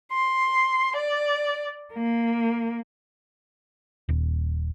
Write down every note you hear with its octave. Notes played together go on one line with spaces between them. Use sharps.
C6
D5
A#3
D#1